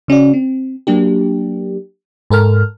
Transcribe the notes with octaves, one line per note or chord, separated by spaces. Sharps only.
C#3 C#4 F#4 D5
C4
F#3 A#3 D4 G4
G#2 A4 A#4 F6